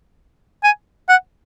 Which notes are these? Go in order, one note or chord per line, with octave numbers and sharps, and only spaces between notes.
G#5
F#5